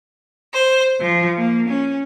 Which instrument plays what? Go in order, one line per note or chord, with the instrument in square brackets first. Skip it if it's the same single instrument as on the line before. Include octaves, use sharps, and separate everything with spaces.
[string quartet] C5
F3
A#3
C#4